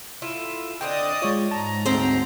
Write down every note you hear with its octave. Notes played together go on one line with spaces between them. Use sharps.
E4 F4 A4
D3 C4 D4 D5 D#5 G5 D#6
G#3 F4 C#5
G#2 A5 A#5
D2 C4 C5